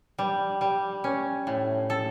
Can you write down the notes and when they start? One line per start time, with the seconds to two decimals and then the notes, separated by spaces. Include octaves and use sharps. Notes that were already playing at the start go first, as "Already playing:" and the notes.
0.19 G3
0.61 G3
1.04 C#4
1.47 A2
1.90 A4